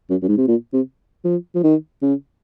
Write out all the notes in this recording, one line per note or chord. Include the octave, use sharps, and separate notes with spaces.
F#2
F#2
G#2
C3
A#2
C3
F3
F3
D#3
C#3